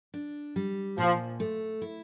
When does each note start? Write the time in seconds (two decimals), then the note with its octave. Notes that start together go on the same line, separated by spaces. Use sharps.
0.14 D4
0.56 G3
0.98 A#2 F3
1.40 A3
1.82 E4